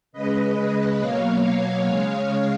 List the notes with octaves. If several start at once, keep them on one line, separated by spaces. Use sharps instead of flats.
C#3 G#3 B4 D#5
B2 F#3 A#3 C#5 F5
C#5 F5
C#3 G#3 C#5 F5